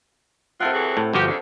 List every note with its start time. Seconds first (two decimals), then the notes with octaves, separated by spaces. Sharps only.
0.60 C3 D#3 E4 F4 A4 F#5
0.73 E3 F#3 G#4
0.97 A2
1.13 G1 F3 F#4 G4
1.27 F2 C#3 D4